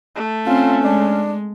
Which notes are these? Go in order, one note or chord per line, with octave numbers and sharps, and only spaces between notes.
A3
C4 C#4 F4
G#3 D4